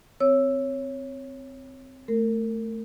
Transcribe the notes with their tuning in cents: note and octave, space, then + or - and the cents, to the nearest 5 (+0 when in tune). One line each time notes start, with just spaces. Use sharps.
C4 -10 C#5 -5 E6 +0
A3 +0 A#4 -30